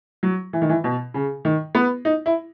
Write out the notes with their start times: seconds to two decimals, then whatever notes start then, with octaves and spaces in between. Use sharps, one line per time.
0.23 F#3
0.53 E3
0.62 D#3
0.69 E3
0.84 B2
1.14 C#3
1.45 D#3
1.75 B3
2.05 D#4
2.26 E4